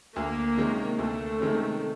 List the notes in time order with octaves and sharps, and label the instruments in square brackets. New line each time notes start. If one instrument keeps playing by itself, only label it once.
[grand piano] D2 [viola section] A#3
[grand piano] C3 D#3 G#3 C#4
[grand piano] D2 [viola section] A3
[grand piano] C3 D#3 G#3 C#4